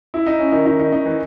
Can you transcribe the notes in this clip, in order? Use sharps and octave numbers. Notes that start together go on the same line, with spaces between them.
E4
D#4
C#4
D#3 D#4
D#3 D#4
D#3 D#4
D#3 D#4
E3